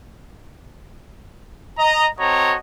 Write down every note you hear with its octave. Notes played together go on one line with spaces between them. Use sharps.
D#5 A#5
C4 F#4 A4 C#5 D#5 A#5